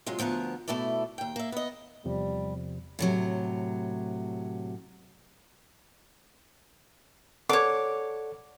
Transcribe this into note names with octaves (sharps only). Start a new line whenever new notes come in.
C3 F#3 G#3 F4
D2 F3 B3 A#4 F#5
B2 A3 E4 A4 D5
D#2 G5
A#3 E5
B3 D#5
E2 C3 F3 G3
A2 C3 F#3
A4 C#5 D5 F#5 D6